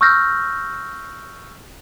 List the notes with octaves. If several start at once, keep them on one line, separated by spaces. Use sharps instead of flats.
C#6 E6 F6 G6 A#6